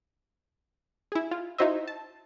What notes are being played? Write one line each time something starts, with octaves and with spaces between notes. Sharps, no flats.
E4 G#4
F4
D#4 E4 F#4 C5 D#5 E5
A5